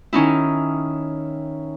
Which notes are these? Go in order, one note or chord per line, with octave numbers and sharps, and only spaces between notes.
D#3 C#4 D#4 E4